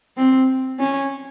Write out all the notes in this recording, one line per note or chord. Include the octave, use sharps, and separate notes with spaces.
C4
C#4